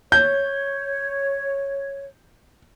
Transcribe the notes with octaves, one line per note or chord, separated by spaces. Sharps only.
C#5 G6